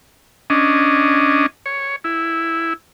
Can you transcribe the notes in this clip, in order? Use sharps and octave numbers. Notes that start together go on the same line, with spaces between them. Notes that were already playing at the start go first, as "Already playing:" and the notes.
C#4 D4 D#5
C#5
E4